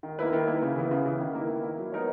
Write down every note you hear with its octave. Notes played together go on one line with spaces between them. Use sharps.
D#3
A#3 E4 B4
D#3
A#3 E4 B4
C#3
E3 B3
C#3
E3 B3
D#3
A#3 E4
D#3
A#3 E4
F#3
B3 D#4 A#4 C#5